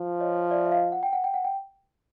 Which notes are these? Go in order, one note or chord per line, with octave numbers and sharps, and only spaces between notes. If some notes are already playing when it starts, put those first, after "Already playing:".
Already playing: F3
C#5 D#5
D5 E5
E5
D#5 F5
F#5
G5
F#5
G5
F#5
G5